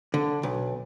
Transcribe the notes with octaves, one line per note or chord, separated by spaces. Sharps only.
D3
B1